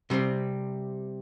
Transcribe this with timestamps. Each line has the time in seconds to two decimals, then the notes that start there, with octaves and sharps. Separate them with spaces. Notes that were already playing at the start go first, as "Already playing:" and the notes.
0.10 C3 G3 C4